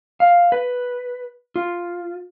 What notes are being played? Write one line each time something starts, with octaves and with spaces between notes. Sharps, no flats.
F5
B4
F4